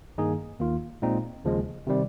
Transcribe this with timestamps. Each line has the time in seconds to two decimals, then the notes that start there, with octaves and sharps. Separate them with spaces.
0.18 G2 D#3 A#3 D#4 G#4
0.60 D#2 D#3 A#3 F4
1.02 A#2 G#3 C4 D#4
1.45 D#2 C#3 F3 G#3
1.87 C3 D#3 G3 C4